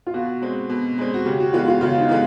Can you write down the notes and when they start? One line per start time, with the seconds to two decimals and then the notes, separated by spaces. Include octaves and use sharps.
0.07 F4
0.14 B2 F#4
0.42 G#3 C4
0.70 B2
0.98 G#3 C4
1.14 F#4
1.25 C#3 G4
1.40 F#4
1.53 E3 G#3 B3 F4
1.68 F4
1.81 C#3 F4
2.00 D#4
2.09 E3 G#3 B3